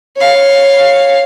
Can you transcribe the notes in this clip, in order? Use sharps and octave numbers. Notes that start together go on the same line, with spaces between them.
C#5 F5